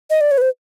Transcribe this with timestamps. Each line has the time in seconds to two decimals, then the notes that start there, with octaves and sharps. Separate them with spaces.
0.10 D#5
0.21 D5
0.31 C#5
0.38 B4
0.41 C5